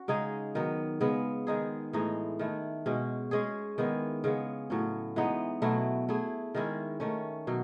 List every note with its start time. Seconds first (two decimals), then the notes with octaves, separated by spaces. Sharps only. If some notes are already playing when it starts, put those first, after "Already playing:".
Already playing: C#4 F#4
0.08 C#3 G#3 D#4 G#4
0.55 D#3 F#3 B3
1.01 C#3 G#3 B3
1.47 D#3 G#3 D#4 G#4
1.93 A2 E3 G#3 D#4
2.39 D#3 A3 E4
2.86 B2 G#3 C#4
3.31 G#3 C#4 G#4
3.78 D#3 G#3 B3 E4
4.24 C#3 G#3 B3
4.70 A2 F#3 C#4
5.16 E3 G#3 B3 D#4
5.62 B2 F#3 A3 E4
6.09 A3 E4 G#4
6.54 D#3 G#3 C#4 E4
7.00 D#3 A3 C#4
7.47 B2 F#3